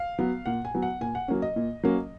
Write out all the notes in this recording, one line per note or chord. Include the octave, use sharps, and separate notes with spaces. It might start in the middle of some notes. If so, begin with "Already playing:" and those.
Already playing: F5
F#3 B3
A#2 F#5
G#5
F#3 B3
F#5
A#2 G#5
F#5
F#3 A#3 C#4
D#5
A#2
F#3 A#3 C#4